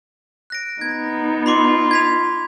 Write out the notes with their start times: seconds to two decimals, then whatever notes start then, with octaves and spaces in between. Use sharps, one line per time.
0.50 F#6 A#6 D7
0.81 B3 D#4 G#6
1.46 F4 B5 C6 D6
1.91 G#6 B6 F7